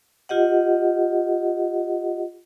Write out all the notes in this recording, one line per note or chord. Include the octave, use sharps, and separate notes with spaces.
F4 G4 D#5 F#5